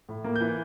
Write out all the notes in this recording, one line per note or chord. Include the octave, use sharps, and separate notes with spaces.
A2
A#3
G6
E3